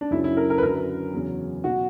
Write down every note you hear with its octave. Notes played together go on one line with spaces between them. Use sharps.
D4
F#2 C#3 F#3 E4
E4
A#4
A#4
B4
F#2 D3 F#3 A#4
E2 C#3 F#3
B2 F#3 F#4